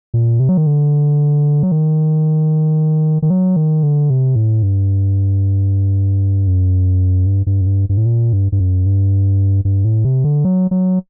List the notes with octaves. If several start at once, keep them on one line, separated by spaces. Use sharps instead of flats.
A#2
C3
F#3
D#3
D3
F#3
D#3
D#3
F#3
D#3
D3
C3
A2
G2
F#2
G2
G2
F#2
G2
G2
A2
A#2
G2
G2
F#2
G2
G2
A2
C3
D3
F#3
F#3